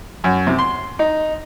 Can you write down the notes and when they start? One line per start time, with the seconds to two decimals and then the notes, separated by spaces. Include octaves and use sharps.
0.24 F#2
0.47 C3
0.58 C6
0.99 D#4